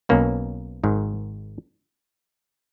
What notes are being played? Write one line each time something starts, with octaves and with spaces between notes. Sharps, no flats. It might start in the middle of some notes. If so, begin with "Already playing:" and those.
B1 B2 A#3 C#4
G#1 G#2 D#3